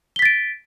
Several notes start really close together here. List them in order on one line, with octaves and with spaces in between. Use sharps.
G7 B6 A6 D7